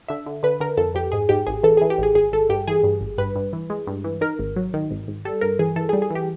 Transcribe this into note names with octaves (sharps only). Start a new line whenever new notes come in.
D3 E5
D3
D3 B4
D3 A#4
F2 A4
F2 G4
G#2 G#4
G#2 G4
A1 G#4
E3 A4
E3 G#4
G4
A1 G#4
G#1 G#4
G#1 A4
G2 G4
E3 G#4
G2
G#1
G2 B4
G2
E3
G#3
G2
E3
D#3 A#4
G#1
F#3
D#3
G#1
G#1
G3 A4
G2 A#4
E3 G#4
E3 A4
G#4
G3
G#4
E3
G4